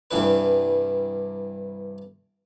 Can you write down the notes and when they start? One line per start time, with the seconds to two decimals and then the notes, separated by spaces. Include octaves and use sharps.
0.11 C2 G2 E3 D4 B4